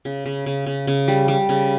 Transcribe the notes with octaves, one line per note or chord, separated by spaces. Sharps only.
C#3
C#3
C#3
C#3
C#3
G3
G3
C#3